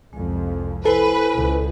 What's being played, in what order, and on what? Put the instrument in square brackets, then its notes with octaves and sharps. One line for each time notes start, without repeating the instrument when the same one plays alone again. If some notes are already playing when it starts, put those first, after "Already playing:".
[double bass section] C2 F2 [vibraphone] G#3
[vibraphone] E4 C5 G#5 [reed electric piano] A4 [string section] B4
[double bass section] C#2